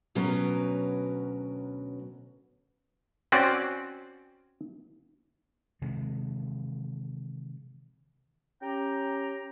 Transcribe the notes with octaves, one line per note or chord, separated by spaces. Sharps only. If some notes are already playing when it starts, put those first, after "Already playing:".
D2 B2 F#3 C#4 A#4 B4
C4 C#4 F#4 D5
C3 D#3 E3 G#3
C#4 G4 G5 A#5